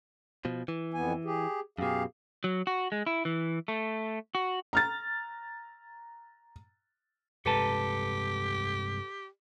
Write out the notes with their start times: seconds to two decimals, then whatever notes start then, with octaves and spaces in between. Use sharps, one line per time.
0.45 B2 F3
0.68 E3
0.94 F2 B3 G#5
1.25 G4 G#4
1.79 F#2 B2 G4 G#4 F5
2.44 F#3
2.67 F#4
2.92 G#3
3.07 E4
3.25 E3
3.68 A3
4.35 F#4
4.73 A#5 F6 A6
7.46 G2 C3 G#3 G4 A4 B4 A5